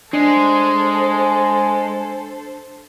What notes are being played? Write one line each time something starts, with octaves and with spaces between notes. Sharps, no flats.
G#3 D4 A4 C5